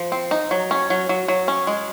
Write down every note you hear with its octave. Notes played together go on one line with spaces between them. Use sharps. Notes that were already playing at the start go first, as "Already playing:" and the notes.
Already playing: F3
C4
D#4
F#3
C#4
F#3
F#3
F#3
C#4
G#3